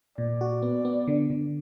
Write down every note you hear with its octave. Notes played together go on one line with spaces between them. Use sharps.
A#2 D5
F#4
B3
B3
D3
D3